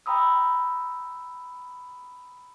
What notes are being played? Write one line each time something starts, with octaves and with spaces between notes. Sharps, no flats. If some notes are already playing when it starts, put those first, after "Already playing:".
G5 A#5 B5 D#6 E6